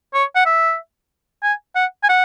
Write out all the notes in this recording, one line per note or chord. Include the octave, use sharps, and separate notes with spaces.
C#5
F#5
E5
G#5
F#5
G#5
F#5